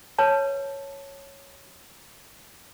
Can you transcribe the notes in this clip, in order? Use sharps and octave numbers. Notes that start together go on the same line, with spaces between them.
B4 C#5 A5